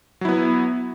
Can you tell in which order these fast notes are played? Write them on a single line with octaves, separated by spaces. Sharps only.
F#3 E4 B3